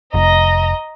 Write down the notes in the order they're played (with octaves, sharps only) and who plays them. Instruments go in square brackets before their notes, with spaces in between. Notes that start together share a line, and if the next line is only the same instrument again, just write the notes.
[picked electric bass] F1 [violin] D#5 A#5